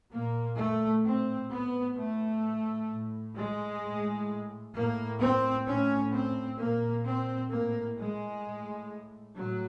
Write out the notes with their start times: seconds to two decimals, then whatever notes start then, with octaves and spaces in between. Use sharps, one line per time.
0.12 A#2 A#3
0.58 A3
1.05 A2 C4
1.51 B3
1.97 A2 A3
2.89 A2
3.35 G#3
3.82 A2
4.75 A2 A#3
5.21 C4
5.66 A2 C#4
6.13 C4
6.59 A#2 A#3
7.05 C4
7.51 A2 A#3
7.98 G#3
8.43 A2
9.36 A2 F#3